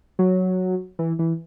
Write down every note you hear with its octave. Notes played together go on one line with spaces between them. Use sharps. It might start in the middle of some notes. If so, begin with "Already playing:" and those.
F#3
E3
E3